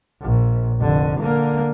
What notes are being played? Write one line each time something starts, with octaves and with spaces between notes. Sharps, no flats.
A#1
F1 D3
D3 A#3